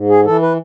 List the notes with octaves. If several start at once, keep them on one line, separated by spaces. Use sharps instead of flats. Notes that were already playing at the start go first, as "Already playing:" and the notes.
Already playing: G#2
G#4
E3 A4
B4